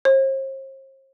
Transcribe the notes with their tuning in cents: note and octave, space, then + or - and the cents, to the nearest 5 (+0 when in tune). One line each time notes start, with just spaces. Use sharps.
C5 +40